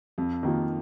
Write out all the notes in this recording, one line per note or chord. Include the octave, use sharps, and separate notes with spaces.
F2
D#3 A#3 F4